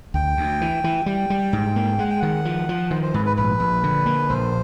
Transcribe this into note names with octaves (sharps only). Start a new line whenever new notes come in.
D2 G5
D2
E3
E3
G3 G5
G3
G#2
A#3
G#3 F#5
G5
D#3 F#5
F3
F3
D#3 C5
C5
G#2 B4
B4
A#1 B4
A#1
D3
A#3
A#1 C5